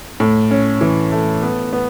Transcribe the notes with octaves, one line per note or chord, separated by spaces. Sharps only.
A2
C#4
E3
A3
B3
B3